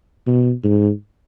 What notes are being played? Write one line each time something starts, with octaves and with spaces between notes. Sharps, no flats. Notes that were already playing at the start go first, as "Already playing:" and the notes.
B2
G#2